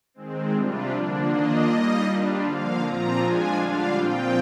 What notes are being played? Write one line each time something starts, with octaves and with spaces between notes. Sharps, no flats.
D#3 G#3 C4
C3 G3 D4 F4
D3 F3 A#3 D4
D#3 A#3 D4 F4 D#5
G3 A#3 D#4 D#5
G3 D4 F4
D3 F3 A#3 F5
A#2 F3 C4 F4 A#5
F3 G#3 D4 F4 G#5
D3 G3 D4 F4 F5
A#2 F3 C4 F4 G5